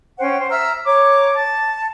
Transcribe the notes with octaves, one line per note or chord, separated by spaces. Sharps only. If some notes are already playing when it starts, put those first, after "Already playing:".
C#4 C5 F#5 G5
C5
E5 A#5 E6 F6
C#5 A#5 D6
A5